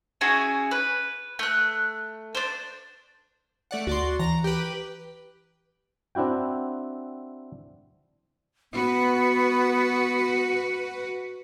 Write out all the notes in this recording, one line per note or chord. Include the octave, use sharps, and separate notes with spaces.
C#4 E4 F#4 G#4
B4
A3 F#6
D4 C5
A3 D5 F#5
D2 F#4 D5 C6
E3 A#5
G4 B4
C4 D4 E4 F#4 G5
B3 F#4 B4